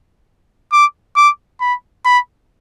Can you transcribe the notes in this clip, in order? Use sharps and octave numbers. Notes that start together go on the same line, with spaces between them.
D6
D6
B5
B5